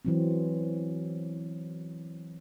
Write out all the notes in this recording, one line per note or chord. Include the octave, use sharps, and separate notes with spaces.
E3 F#3 C4